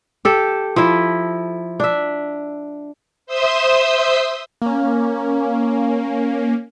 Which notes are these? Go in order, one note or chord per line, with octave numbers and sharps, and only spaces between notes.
G4 A4
F3 E4
D4 E5
C5 E5 C6 D#6 E6
A#3 C#4